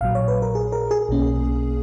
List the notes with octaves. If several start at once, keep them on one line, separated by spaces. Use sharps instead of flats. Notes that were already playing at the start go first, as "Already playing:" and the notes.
A#1 A#2 F#3 F5
C#5
B4
A#4
G#4
A#4
G#4
B1 B2 A#3 C#4